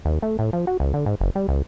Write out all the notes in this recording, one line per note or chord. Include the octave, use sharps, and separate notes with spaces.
D#2
A3
A2
F3
F#4
C#2
D3
G#2
F#1
G3
C#2